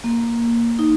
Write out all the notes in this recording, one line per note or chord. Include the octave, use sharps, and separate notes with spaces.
A#3
D#4